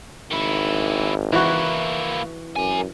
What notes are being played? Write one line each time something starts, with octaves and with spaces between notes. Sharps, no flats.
G#1 D#3 E4
E3 A#3 E4 F#4
F#2 A#4 G#5